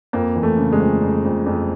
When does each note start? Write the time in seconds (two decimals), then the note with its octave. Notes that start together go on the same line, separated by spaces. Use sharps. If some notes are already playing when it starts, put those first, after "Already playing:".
0.13 F2 A#3
0.36 E3
0.43 A3
0.58 C#3
0.73 G#3
0.80 F2
1.02 F2
1.24 F2
1.46 F2